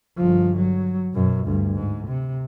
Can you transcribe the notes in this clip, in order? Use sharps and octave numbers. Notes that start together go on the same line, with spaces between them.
G1 F3
F#3
F#2 B2
D2 G2
G#2
C3